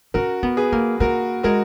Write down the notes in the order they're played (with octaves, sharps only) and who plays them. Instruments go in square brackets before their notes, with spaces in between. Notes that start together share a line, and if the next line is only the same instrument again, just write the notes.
[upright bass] C#4 [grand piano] F#4 A#4
[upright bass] B3
[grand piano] G#4 B4
[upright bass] A#3
[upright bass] A#3 [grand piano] F#4 A#4
[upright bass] G#3 [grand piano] F#4 A#4